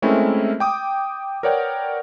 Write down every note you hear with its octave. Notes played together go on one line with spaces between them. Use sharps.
G#3 A3 C4 C#4 E4 A#4
G5 D6 D#6
A#4 B4 C#5 D5 F#5 G5